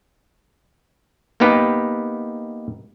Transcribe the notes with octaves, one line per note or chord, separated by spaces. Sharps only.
A#3 B3 D#4 G4 B4